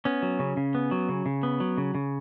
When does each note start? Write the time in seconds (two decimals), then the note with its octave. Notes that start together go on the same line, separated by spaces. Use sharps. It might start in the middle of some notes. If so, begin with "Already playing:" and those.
0.05 B3 C#4
0.22 F#3
0.39 C#3
0.57 C#3
0.75 B3
0.91 F#3
1.09 C#3
1.26 C#3
1.43 B3
1.60 F#3
1.78 C#3
1.95 C#3